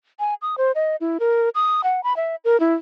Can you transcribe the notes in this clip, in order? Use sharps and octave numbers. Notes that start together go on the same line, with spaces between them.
G#5
D#6
C5
D#5
E4
A#4
D#6
F#5
B5
E5
A#4
E4